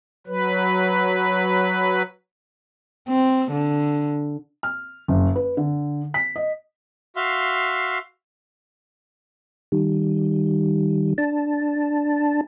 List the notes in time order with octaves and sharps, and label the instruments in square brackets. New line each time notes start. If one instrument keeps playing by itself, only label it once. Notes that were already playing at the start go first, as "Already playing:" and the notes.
[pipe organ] F#3 B4
[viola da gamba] C4
D3
[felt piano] F6
F#1
B4
D3
B6
D#5
[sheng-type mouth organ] F#4 E5 F5 C6
[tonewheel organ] D#3 G3
D4 A5